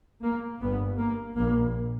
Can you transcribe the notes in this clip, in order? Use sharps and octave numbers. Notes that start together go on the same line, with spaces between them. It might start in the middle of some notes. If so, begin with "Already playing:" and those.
A#3
G1 G2 B3
A#3
A#1 A#2 A#3